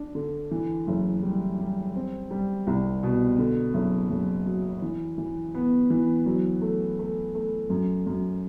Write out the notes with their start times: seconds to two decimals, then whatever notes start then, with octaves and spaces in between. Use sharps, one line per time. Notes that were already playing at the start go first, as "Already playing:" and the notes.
Already playing: D4
0.15 D3
0.51 E3
0.87 F#1
1.23 G3
1.59 G3
1.95 C4
2.31 G3
2.67 C2
3.03 B2
3.38 D3
3.74 F#1
4.10 F#1
4.46 F#3
4.82 E3
5.18 E3
5.55 B3
5.90 E3
6.26 F#3
6.62 A3
6.99 A3
7.35 A3
7.70 F#2
8.07 F#2